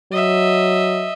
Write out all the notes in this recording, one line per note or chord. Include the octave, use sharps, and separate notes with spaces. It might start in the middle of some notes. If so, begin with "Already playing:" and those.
F#3 D#5 E5